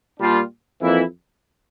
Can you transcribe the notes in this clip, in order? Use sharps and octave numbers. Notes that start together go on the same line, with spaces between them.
A#2 G3 D4 F4
F2 E3 A#3 E4